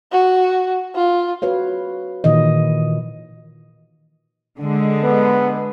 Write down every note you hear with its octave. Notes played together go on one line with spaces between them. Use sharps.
F#4
F4
F#4 B4 C#5 F5
A#2 D#3 E3 D#5
D3 G#3
B3